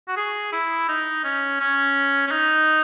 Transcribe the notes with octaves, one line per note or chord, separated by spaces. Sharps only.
F#4
G#4
E4
D#4
C#4
C#4
C#4
D#4